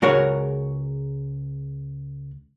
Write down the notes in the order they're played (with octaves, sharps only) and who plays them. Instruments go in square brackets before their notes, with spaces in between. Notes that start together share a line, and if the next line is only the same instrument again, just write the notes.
[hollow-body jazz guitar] C#2 G#3 F#4 A#4 C#5